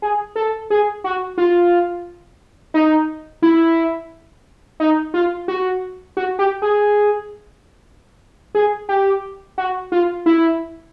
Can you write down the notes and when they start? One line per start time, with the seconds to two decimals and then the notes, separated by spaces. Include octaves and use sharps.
0.02 G#4
0.36 A4
0.70 G#4
1.04 F#4
1.38 F4
2.74 D#4
3.42 E4
4.80 D#4
5.14 F4
5.48 F#4
6.17 F#4
6.39 G4
6.62 G#4
8.55 G#4
8.89 G4
9.58 F#4
9.92 F4
10.26 E4